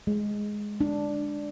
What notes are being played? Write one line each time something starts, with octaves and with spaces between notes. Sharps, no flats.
G#3
D4